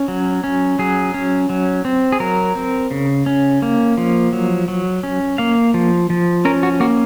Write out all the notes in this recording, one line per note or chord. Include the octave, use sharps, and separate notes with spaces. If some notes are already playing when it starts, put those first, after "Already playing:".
Already playing: C#4
F#3
C#4
F#3 G#4
C#4
F#3
C4
G#4
F#3 A#4
C4
C#3
C#4
A#3
F3
F#3
F#3
C#4
A#3 F5
F3
F3
C#4 A#4
F#4
A#3 F#4